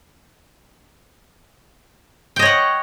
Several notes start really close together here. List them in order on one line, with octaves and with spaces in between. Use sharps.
G5 D#5 C#5 F#5